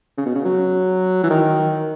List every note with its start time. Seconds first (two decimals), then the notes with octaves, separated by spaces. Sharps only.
0.17 C#3
0.26 B2
0.35 C#3
0.45 F#3
1.23 E3
1.30 D#3